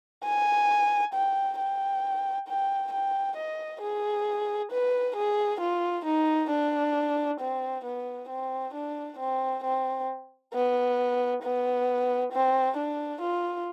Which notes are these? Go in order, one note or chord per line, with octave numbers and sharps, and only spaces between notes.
G#5
G5
G5
G5
G5
D#5
G#4
B4
G#4
F4
D#4
D4
C4
B3
C4
D4
C4
C4
B3
B3
C4
D4
F4